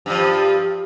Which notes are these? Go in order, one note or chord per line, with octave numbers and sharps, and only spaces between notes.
G2 F3